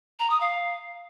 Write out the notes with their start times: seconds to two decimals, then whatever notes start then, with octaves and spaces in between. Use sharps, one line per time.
0.19 A#5
0.30 D#6
0.40 F5